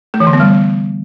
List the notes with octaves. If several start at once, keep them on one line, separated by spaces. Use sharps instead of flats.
A3
E3
D3
B3
G3